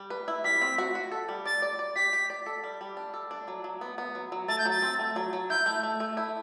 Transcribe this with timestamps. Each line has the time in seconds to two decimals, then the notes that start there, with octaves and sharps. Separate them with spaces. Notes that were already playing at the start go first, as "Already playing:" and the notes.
Already playing: G3
0.10 B4
0.28 E4
0.44 G3 B6
0.62 C4
0.78 F#4
0.95 F#4
1.12 A4
1.29 G3
1.45 D5 A6
1.62 D5
1.79 D5
1.96 G4 B6
2.13 G4
2.30 D5
2.46 A4
2.64 G3
2.81 G3
2.97 D4
3.14 A4
3.31 D4
3.48 F#3
3.64 F#3
3.81 B3
3.98 B3
4.15 F#3
4.32 F#3
4.48 A3 A6
4.59 G6
4.65 F#3 A6
4.82 C4
4.99 A3
5.16 F#3
5.33 F#3
5.50 E4 G6
5.66 A3
5.83 A3
6.00 A3
6.17 E4